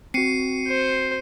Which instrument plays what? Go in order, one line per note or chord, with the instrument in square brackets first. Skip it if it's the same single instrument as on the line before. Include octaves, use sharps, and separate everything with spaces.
[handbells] C4 F#4 [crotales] C7 C#7 D#7
[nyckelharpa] C5